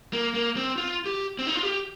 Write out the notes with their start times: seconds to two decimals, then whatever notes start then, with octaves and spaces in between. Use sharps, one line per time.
0.13 A#3
0.35 A#3
0.57 C4
0.78 F4
1.06 G4
1.39 C4
1.47 D#4
1.55 F4
1.63 G4